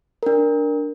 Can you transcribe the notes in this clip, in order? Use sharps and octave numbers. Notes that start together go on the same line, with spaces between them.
D4 A#4